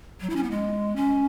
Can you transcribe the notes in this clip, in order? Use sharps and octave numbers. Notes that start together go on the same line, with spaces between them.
F#3
E4
C#4
B3
G#3
C#4